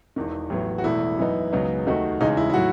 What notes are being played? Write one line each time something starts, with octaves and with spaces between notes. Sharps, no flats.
E1 E2 D#3
A1 A2 F#3 B3
F#4
E1 E2 B2 A3 E4
F#2 E3 B3 D#4
C#2 C#3 F#3 B3 D#4
D#2 D#3 A3 D#4 F#4
E2 C#3 G#3 D#4
E4
E4
A2 F#3 F#4